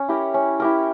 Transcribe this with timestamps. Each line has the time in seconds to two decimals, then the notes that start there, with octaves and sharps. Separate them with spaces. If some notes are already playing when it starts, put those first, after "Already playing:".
Already playing: C#4
0.08 E4 G4 A#4
0.34 C#4
0.60 E4 G4 A#4